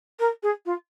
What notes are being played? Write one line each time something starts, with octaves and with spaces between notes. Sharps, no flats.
A#4
G#4
F4